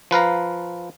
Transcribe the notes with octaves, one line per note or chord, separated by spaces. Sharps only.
F3 B4 F5 A#5